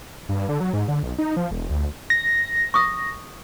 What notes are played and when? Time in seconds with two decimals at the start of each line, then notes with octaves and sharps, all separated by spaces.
0.29 G2
0.49 D3
0.60 F#3
0.73 G#2
0.88 D3
1.03 B1
1.19 D#4
1.37 F3
1.51 E1
1.70 D2
2.10 A#6
2.74 C#6 D#6